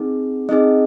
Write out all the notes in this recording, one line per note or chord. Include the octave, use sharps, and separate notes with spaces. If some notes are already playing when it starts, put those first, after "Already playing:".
Already playing: C4 D#4 G#4
C4 D#4 G#4 D#5